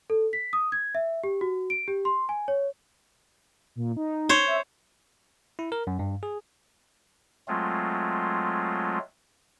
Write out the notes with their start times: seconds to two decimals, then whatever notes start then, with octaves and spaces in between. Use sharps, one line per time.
0.10 A4
0.33 B6
0.53 D#6
0.72 G#6
0.95 E5
1.24 G4
1.41 F#4
1.70 D7
1.88 G4
2.05 C6
2.29 G#5
2.48 C#5
3.75 A#2
3.97 D#4
4.29 C5 C#5
4.47 E5
5.59 E4
5.72 A#4
5.87 F#2
5.99 G2
6.23 G#4
7.48 F#3 G#3 A3 C4 F4